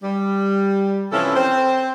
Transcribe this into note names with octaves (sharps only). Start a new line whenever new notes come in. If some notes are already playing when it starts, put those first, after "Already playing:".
G3
C3 E3 F3 C#4 E4 A4
C4 C5